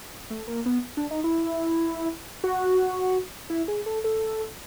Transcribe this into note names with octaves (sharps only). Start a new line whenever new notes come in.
A3
A#3
B3
D4
D#4
E4
F#4
E4
G#4
A4
A4